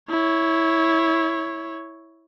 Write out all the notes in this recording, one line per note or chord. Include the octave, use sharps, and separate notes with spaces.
E4 C#5